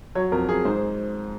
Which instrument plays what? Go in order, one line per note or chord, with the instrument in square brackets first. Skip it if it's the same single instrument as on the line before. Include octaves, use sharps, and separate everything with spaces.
[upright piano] F#3 C#5
F2 A#4
F2 G#4
G#2 C5